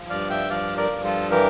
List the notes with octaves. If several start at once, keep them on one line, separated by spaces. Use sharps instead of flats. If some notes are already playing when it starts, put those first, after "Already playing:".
Already playing: F3
G2 D5 F5
E5 G5
F3 D5 F5
A#4 D5
G2
F4 A4
E3 G4 A#4